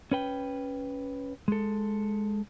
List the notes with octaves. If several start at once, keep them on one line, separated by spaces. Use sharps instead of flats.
C#4 B4 G5
G#3 A4